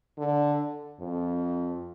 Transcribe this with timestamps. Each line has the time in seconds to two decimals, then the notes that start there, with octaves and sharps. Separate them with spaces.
0.18 D3
1.00 F2